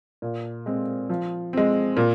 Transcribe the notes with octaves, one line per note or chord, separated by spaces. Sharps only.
A#2
G#3 C4
F3
G#3 C4
A#2